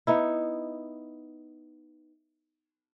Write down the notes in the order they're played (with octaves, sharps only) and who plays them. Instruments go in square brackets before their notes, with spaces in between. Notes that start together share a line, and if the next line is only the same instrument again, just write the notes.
[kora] B3 D#4 E4